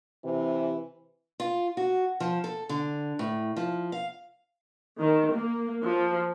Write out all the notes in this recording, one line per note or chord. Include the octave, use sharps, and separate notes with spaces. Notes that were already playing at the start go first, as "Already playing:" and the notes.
C3 E3
F4
F#4
F3
A4
D3
A2
F3
F5
D#3
A#3
F3